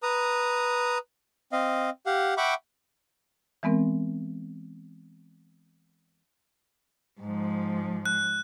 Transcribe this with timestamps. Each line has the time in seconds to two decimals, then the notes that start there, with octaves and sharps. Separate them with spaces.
0.03 B4 A#5 D#6
1.52 C4 D#5 F5
2.06 G4 F5 F#5
2.37 E5 F#5 G5 B5 C#6 D6
3.63 E3 G#3 B3 C4 A#4
7.21 G#2 F3
8.06 F#6